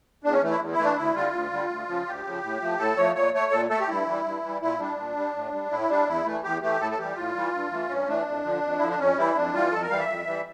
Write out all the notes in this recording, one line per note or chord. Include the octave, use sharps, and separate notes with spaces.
E2 D4
C#4
E3 A3
E4
E2
E4
E3 A3
D4
D2 E4
D3 G3 F4
D2
D3 G3
D2
C#3 F3
D2 G4
C#3 F3
A2
F3 A3
A2 A4
F3 A3 C#5
A#2 C#5
A3 C#5
A#2 A4
A3 A4
G4
G2 E4
E3 G3
G2
E3 G3
A#2 E4
G3 D4
A#2
G3
A2
G3
A2 E4
G3 D4
E2 E4
E3 A3
E2 G4
E3 A3 G4
A2 A4
A4
E3 G3 G4
A2 F4
E3 G3
G2
E3 A3
G2 C#4
E3 A3 D4
F2
D3 F3
F2
D3 F3 E4
D4
F2 C#4
E3 G3 E4
F2 D4
E3 G3 F4
F2 A4
A#4
E3 G3 F5
E5
F2
E3 G3